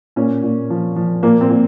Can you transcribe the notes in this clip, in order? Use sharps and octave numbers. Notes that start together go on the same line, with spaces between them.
A#2 C#4
A#2
F3
F3
A#2 A#3
C4
A#2